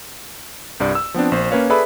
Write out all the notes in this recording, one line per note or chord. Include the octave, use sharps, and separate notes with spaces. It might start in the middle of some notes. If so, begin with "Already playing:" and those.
C2 G2 D5
E6
F3 B3 C4 D4
A#1 C5
A#3 C#4 B4 C#5 F5
G#4 A4 B4 D5 E5 B5